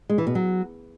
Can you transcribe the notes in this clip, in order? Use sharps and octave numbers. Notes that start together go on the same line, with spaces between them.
G#3
E3
B2
F#3